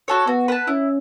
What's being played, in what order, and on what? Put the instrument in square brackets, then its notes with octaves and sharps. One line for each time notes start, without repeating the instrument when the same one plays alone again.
[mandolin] F#4 A4 C#5
[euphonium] B3 [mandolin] F#4
[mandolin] B4 F#5 A5
[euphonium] C#4 [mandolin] E4